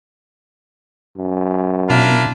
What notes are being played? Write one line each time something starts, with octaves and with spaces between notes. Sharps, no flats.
F#2
B2 D4 E4 F4 A#4